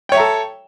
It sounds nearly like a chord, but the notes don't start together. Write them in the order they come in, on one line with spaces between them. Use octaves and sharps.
G5 C#5 E5 A#5 A4